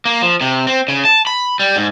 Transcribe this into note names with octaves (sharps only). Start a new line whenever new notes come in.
A#3
F3
C3
C4
C#3
A5
B5
G3
G#2